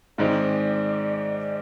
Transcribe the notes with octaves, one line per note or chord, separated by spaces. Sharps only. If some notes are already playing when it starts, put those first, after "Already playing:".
G#2 D#3 G#3 C4 D5